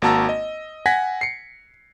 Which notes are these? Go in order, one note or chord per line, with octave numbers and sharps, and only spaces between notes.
G#1 A#3 F#4 A5 A#5 E6
D#5
F#5 G#5 G#6 A#6 B6
C7 C#7